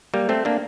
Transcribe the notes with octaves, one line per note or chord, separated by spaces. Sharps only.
G3 A#3
A3 C4
A#3 D4